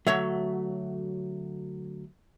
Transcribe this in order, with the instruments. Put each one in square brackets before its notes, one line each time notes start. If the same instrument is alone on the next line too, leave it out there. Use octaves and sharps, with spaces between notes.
[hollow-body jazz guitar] D3 F#3 A3 [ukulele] F#4 C#5 E5